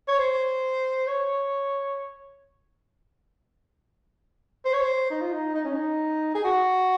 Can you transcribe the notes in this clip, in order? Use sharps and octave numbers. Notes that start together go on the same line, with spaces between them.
C#5
C5
C#5
C5
C#5
C5
D#4
F4
D#4
D#4
C#4
D#4
G#4
F#4